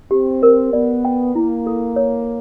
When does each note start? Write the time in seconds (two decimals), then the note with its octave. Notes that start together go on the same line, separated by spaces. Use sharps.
0.11 C4 G4
0.43 A#4
0.72 B3 D5
1.05 G5
1.34 A#3 E4
1.67 A4
1.96 C#5